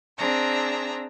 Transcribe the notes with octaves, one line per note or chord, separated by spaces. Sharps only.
C4 D4 G#4 E5 A#5